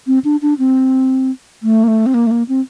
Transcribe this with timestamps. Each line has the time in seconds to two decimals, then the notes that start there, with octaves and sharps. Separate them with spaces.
0.07 C4
0.24 D4
0.42 D4
0.59 C4
1.63 A3
1.84 A#3
1.88 A3
2.06 C4
2.14 A#3
2.27 A3
2.31 A#3
2.49 C4